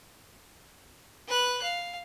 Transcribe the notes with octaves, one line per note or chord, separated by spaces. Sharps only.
B4 F#6
F5